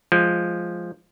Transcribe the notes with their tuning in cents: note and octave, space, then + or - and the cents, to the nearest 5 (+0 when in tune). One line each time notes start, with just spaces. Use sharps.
F3 +0 G#3 +0